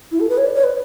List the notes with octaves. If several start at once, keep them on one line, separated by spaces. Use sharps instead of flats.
E4
A4
B4
C#5
D5
C#5
B4